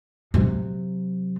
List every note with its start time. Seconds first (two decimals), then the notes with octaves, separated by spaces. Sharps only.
0.34 C3 F#3